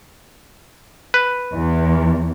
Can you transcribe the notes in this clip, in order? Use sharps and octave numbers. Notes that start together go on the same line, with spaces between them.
B4
E2